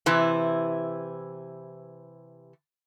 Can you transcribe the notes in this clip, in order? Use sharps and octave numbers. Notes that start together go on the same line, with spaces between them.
C3 E3 E4